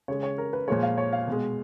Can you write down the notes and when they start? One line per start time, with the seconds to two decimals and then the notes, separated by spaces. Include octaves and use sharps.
0.08 C#3 G#3 C#5
0.23 C#5
0.38 A#4
0.53 B4
0.68 A#2 F3 G#3 C#5
0.83 F5
0.98 C#5
1.13 F5
1.27 B2 G#3